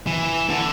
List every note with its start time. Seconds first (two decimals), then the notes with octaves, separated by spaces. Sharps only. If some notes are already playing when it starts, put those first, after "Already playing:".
0.07 E3
0.50 D3